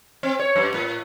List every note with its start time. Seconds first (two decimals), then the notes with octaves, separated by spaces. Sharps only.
0.23 C4
0.39 C#5
0.56 F#2
0.74 A2